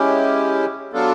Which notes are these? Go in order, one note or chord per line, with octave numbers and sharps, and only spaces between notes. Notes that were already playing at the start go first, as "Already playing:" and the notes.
Already playing: G#3 C#4 E4 G4
F#3 B3 D4 F4 A4